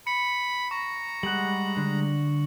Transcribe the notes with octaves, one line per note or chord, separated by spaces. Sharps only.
B5 C#7
A#5 C#6
G3 G#3 F#5 F#7
D3